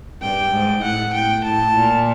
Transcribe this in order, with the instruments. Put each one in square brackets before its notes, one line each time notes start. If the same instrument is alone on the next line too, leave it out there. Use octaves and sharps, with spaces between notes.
[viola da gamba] G2 [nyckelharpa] G5
[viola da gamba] G#2
[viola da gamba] A2 [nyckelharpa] F#5
[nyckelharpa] G5
[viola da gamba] A2 [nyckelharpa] A5
[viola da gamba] A#2